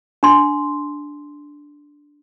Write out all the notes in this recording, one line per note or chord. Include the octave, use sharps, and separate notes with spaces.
D4 C6